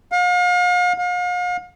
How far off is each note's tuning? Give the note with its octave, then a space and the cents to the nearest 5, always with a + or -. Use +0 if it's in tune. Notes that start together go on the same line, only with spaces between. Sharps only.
F5 +40
F5 +40